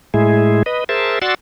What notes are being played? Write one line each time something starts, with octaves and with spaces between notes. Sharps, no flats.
A2 G#3 E4 G#4
B4 D#5
G#4 A#4 C5 E5 A5
F#4 D5 F#5 C6 E6 A6